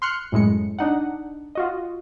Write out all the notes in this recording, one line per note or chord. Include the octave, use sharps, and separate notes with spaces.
C6 F6 F#6 C#7
F#2 A2 G#3 C#7
D4 D#4 F#5
F4 F#4 D#5